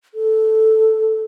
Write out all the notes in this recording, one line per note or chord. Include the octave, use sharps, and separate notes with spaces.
A4